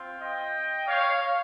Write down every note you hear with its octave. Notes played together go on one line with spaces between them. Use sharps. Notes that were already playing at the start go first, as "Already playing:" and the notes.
Already playing: C4 F4
D#5 G5
C#5 F5